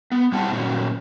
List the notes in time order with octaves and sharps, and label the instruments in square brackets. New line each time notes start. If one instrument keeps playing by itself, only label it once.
[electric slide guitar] B3
G3 C4 E4 F#5 A5
A#2 D#3 F#3 C#4 F#4